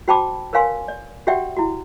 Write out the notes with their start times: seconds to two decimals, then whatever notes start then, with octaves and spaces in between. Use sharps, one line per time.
0.08 F#4 C5 G5 A5 B5 D6
0.53 A#4 B4 C#5 F5 G#5 C6
0.88 D5
1.27 F#4 G4 D5 E5 F#5 G5
1.57 E4 F#4